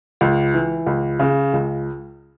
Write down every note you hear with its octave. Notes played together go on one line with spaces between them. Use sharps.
C#2
E3
C#2
C#3
C#2